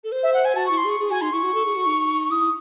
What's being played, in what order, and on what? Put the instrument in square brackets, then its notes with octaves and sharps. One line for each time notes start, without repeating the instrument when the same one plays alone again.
[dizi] A4
C5
[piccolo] E5
F#5
G#5
[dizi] F#4 [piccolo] A5
[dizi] E4 [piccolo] C#6
[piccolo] C6
[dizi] G#4 [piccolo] C#6
[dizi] G#4
[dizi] F#4 [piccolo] G#5
[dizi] D#4 [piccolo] C6
[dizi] E4 [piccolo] C#6
[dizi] F#4
A4
G#4
F#4
D#4
[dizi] E4 [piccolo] D#6